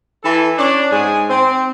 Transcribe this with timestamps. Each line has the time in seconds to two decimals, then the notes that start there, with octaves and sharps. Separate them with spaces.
0.24 E3 E4 A4
0.58 C#4 D4
0.90 G#2 G#4 G#5
1.29 C4